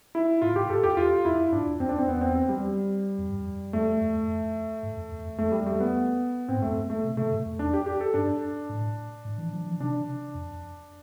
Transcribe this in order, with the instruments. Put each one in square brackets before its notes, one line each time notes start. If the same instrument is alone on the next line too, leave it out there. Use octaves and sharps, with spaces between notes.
[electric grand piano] E4
[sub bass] A2 [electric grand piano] F4
[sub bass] A2 [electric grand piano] G4
[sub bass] G2 [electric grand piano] A4
[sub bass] F2 [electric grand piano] G4
[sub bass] E2 [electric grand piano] F4
[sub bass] F2 [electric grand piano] E4
[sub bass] G2 [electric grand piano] D4
[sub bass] E2
[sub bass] F2 [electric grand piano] C4
[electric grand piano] D4
[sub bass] E2
[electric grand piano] C4
[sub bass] E2 [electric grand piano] B3
[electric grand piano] C4
C4
G3
[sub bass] F2
G2
F2
[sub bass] F2 [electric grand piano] A3
[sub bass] F2
F2
E2
F2
G2
F2
E2
F2
[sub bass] F2 [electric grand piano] A3
[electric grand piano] G3
A3
B3
[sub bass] A2 [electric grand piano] C4
[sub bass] G2
[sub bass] F2 [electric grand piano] A3
[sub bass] G2
[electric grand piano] A3
[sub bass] B2
[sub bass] C3 [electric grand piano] A3
[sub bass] G2
F2
[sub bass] E2 [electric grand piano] D4
[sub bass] F2 [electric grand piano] G4
[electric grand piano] G4
A4
[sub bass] G2 [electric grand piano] D4
[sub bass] A2
A2
E3
F3
E3
[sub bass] C3 [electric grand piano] D4
[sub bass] F2